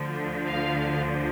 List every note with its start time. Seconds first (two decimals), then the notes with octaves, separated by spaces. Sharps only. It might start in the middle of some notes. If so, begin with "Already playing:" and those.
Already playing: D2 D3 F3
0.46 F5